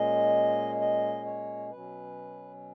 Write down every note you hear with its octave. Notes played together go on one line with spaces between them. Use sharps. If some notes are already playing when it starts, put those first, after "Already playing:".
Already playing: A#2 G#3 C#4 D#5
D#5
C#5
B2 F#3 C#4 B4